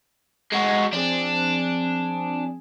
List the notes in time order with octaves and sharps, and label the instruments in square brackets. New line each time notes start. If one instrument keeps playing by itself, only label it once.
[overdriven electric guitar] G#3 F#4
[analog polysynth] F3 C4 G#4 [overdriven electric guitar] D4